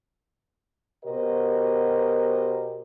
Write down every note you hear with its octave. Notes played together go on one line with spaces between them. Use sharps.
B2 F#4 G4 A#4 C5 D#5